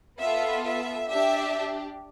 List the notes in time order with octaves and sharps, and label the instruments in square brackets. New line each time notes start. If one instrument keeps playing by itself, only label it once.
[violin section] B3 F4 A4 E5
E5
D4 G4 E5